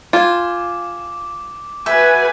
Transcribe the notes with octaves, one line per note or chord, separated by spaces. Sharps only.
F4 G5 G#5 D6
F#4 B4 E5 G#5 G6